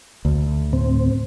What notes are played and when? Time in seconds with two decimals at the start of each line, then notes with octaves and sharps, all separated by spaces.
0.25 D2
0.73 A2 C4